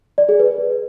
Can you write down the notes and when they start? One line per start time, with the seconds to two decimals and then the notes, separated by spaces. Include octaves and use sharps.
0.18 D5
0.29 G#4
0.39 B4